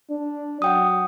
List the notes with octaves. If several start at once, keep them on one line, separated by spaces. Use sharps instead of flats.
D4
F#3 F#5 G5 D#6